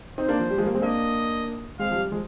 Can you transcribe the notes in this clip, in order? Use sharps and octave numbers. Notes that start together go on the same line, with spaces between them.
C4 D#4 C5
A#3 D4
F3
G3
F3 G#3
G3 A#3
G#3 C4
A#3 D4 D#5
G#3 C4 F5
F3
G3
F3 G#3